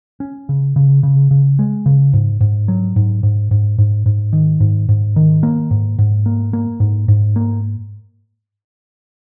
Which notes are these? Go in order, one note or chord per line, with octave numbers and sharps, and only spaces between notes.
C#4
C#3
C#3
C#3
C#3
G#3
C#3
G#2
G#2
F#3
G#2
G#2
G#2
G#2
G#2
D#3
G#2
G#2
D#3
A#3
G#2
G#2
A#3
A#3
G#2
G#2
A#3